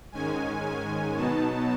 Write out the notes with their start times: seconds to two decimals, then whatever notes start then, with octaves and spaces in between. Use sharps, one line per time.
0.12 G#2 D#3 G#3 C#4 G#5
0.64 G#5
1.16 B2 F#3 B3 D#4 A5